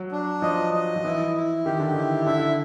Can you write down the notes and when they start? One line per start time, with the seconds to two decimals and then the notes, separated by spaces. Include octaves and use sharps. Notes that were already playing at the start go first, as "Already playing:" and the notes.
Already playing: F#3
0.12 D4
0.42 F3 D#5
0.73 D#5
0.96 F3
1.04 E3 E4
1.35 E4
1.66 D#3 G4
1.79 D3
1.93 D#3 E4
2.26 D3 E5